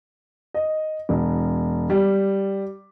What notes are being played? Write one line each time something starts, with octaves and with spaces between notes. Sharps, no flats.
D#5
E1
G3